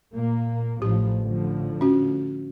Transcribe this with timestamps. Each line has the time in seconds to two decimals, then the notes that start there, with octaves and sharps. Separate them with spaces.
0.13 A#2 A#3
0.82 A1 F3 G4
1.22 A2 D3 F3
1.81 C#4 F#4